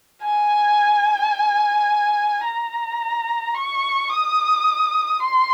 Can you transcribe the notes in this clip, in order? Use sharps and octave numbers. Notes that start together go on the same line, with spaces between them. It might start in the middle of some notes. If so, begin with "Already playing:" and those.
G#5
A#5
C#6
D#6
C6